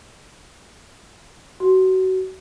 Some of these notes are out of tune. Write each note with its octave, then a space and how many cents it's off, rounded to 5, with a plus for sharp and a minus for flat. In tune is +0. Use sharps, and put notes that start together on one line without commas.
F#4 +25